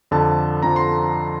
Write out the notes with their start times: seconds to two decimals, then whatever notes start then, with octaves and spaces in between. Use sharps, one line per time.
0.11 F2 D3 F3 A5
0.63 F2 D3 F3 A#5
0.76 C6